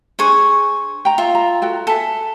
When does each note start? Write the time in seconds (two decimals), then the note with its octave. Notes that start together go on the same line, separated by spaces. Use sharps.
0.19 D4 G#4 C5 G#5 C#6
1.05 G5 A#5
1.18 F4 E5
1.35 A#5
1.62 F#4 A4 G5
1.87 A4 E5 G#5